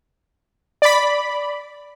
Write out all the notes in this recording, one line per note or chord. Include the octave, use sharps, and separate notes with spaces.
D5 B5